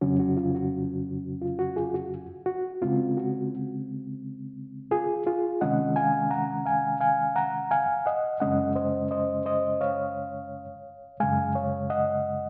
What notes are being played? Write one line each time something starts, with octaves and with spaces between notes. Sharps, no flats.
F2 C#3 F#3 C#4 F#4
F#4
F4
F#4
F4
F#4
F4 G#4
F#4
F#4
C#3 G#3 C4 F4
F#4
F4 G#4
F4 G#4
C3 D#3 G#3 C#4 D#5 F#5
F5 G#5
F#5 A#5
F5 G#5
F5 G#5
F#5 A#5
F5 G#5
D#5 F#5
F#2 C#3 G#3 C#4 D#5 F#5
C5 D#5
C5 D#5
C5 D#5
C#5 F5
F#2 C#3 G#3 F5 G#5
C#5 F5
D#5 F#5